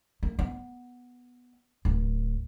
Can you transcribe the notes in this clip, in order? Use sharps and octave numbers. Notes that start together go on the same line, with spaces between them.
A#3
B3
D1